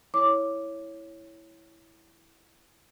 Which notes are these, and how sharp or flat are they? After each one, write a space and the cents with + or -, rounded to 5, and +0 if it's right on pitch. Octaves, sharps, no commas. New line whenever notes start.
E4 +0 C#5 +0 D6 +0